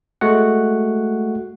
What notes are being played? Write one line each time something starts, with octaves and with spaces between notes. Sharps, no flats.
G#3 A3 F#4 F#5